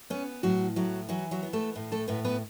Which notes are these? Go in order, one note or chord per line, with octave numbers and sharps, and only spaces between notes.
B3 C#4
A2 F#3 F#4
A2 F#3 F#4
E3 F#3 F#4
F#3 F#4
B3
A3 A4
A2
A3 A4
A2 B3 B4
B3 B4